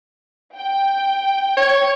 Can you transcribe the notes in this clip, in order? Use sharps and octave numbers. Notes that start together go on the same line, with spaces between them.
G5
C#5